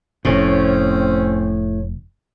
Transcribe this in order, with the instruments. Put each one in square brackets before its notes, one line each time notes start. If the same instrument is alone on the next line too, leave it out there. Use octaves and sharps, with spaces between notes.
[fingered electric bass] F1 [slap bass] A2 [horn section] C4 C#4